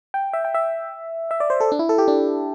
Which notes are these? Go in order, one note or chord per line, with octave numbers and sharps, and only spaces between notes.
G5
E5
G5
E5
E5
D5
C5
A4
D4
E4
A4
G4
D4